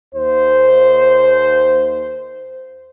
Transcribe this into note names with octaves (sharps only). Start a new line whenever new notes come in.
D#2 C5